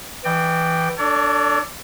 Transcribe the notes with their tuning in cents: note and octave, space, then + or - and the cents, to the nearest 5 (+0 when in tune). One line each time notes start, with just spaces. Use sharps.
E3 +0 D5 +45 G5 +0
D4 +0 A4 +25 C#5 +45